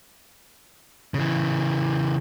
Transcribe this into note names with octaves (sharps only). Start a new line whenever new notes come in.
C#3 E3